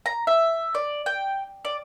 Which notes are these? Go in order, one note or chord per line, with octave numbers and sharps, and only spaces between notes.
A#5
E5
D5
G5
D5